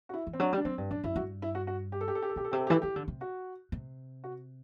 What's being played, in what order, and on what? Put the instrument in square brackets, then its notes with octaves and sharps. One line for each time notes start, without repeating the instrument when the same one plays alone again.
[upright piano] F#4
E4
[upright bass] E3
[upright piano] C4
[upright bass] F#3 [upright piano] D4
[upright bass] G3 [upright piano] D4
[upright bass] F#3 [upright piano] C4
[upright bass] G2
[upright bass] F#2 [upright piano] D4
[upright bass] F#2 [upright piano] E4
[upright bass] G2 [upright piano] F#4
[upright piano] E4
F#4
F#4
G4
A4
G4
A4
G4
A4
[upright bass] B2 [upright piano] G4
[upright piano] A4
[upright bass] C3 [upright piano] G4
[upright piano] A4
G4
[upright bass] E3 [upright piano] A4
[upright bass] E3 [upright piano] G4
[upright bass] D3
C3
[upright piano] F#4
[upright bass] C3
[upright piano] F#4